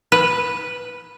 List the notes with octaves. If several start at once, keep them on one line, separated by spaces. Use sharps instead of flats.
B4